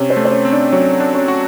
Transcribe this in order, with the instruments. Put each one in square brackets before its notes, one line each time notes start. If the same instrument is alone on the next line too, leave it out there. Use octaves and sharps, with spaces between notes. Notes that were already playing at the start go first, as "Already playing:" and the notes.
Already playing: [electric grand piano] C3 [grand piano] C#4 C#5
[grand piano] C4 C5
[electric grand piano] A3
[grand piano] C5
C#4 C#5
[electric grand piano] C4
[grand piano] D4 D5
[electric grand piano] F#3 [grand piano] C#4 C#5
[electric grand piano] D4
[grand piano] C#4 C#5
[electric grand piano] F#4